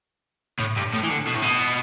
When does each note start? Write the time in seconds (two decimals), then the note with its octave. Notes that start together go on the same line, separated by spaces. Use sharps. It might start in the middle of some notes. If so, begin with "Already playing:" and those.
0.60 A2
0.77 G2
0.94 A2
1.03 E3
1.11 D3
1.27 B2
1.35 A2
1.42 B2